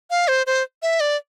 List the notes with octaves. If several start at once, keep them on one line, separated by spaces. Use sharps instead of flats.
F5
C5
C5
E5
D5